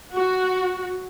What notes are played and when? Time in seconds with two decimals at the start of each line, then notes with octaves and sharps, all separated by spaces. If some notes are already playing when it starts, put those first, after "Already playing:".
0.15 F#4